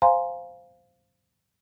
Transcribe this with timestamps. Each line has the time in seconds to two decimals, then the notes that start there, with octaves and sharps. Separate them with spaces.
0.02 C5 F5 G#5 A#5 C6